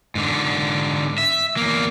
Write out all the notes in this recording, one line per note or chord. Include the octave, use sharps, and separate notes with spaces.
G#2 D3
E5
E2 A#3